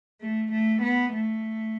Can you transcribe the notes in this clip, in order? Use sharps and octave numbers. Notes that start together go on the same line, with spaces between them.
A3
A3
B3
A3